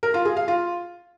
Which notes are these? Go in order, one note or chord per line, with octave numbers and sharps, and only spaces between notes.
A#4
F4
G#4
F5
F4